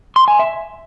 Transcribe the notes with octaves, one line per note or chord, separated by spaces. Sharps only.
C6
G#5
E5